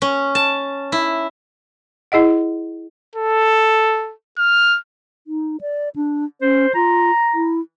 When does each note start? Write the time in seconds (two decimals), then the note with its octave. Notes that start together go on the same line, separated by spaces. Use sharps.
0.02 C#4
0.35 A5
0.92 E4
2.12 E4 G#4 D#5 F#5
3.15 A4
4.38 F6
5.27 D#4
5.61 D5
5.96 D4
6.42 C#4 C5
6.75 F4 A#5
7.34 E4